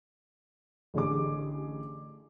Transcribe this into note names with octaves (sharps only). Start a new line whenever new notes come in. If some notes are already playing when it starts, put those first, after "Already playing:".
A1 D3 G4 G#4 D6